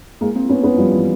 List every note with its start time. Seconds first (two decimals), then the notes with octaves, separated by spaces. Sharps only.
0.21 G#3 A#3
0.35 A#3 C4
0.49 B3 C#4
0.63 B3 C#4
0.77 F3 G3
0.92 E3